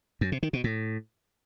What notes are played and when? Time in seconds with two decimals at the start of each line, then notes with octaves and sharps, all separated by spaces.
0.21 F#2
0.32 C3
0.43 D#3
0.53 B2
0.64 A2